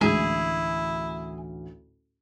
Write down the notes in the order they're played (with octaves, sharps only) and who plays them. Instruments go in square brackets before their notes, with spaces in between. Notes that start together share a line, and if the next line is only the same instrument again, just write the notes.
[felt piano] A1 D2 [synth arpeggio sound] G#3 [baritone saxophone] E4 [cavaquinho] G#4